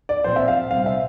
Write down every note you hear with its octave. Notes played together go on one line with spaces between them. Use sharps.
D5
A#2 F3 C4 C5
E5
F5
C3 G3 C4 F5
E5